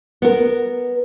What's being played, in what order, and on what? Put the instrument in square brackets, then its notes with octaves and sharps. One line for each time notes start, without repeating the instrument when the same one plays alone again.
[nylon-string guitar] B3 A#4